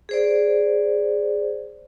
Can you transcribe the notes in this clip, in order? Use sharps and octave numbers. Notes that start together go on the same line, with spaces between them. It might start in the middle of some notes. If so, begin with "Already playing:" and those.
G#4 C5 D5